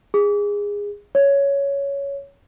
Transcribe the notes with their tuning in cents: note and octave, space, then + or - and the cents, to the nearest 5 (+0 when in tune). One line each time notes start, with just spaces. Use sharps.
G#4 -20
C#5 +10